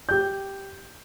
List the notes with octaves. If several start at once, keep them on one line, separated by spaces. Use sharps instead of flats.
G4 G6